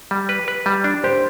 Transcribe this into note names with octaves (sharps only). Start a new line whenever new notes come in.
G3
B4
B4
G3
D4
G4 C5